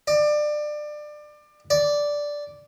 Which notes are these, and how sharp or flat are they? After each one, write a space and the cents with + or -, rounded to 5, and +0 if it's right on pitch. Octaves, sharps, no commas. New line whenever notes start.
D5 +25
D5 -5